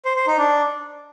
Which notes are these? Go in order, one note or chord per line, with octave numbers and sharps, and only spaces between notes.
C5
C5
D#4
D4